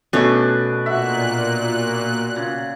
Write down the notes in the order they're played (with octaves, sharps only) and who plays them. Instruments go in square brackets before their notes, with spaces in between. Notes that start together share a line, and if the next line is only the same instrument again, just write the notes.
[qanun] B2 A3 C#4 [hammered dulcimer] D4
[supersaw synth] A#2 F#6 [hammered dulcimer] F#4 E5
[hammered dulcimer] C#3